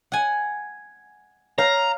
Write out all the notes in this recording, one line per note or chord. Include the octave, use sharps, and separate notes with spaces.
F#5 G#5
C#5 F5 A#5